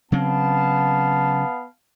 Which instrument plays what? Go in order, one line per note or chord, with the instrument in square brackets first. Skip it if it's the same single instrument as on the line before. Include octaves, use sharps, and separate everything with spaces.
[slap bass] C#3 F#3 C4 [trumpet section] B3 F5 A5